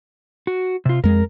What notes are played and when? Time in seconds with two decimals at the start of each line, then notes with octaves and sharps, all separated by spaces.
0.47 F#4
0.85 C3 F4
1.04 F2 G#3 A#4